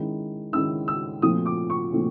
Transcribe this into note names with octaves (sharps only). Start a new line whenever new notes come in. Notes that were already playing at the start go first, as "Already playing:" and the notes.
Already playing: D#3 G#3 C#4 E4
D#3 G#3 C#4 E4 E6
E6
A#2 F3 A3 C4 D#6
D6
C#6
A#2 F3 A3 C4